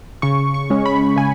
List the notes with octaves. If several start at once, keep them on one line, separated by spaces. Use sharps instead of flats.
C#3 C#6
C#6
G#3 C#4
B5
C#3 G#5